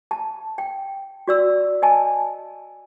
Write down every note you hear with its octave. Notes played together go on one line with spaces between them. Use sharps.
A5
G5
F#4 D5 E6
D#5 G#5 A5